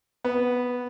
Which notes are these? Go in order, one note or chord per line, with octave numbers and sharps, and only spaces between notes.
B3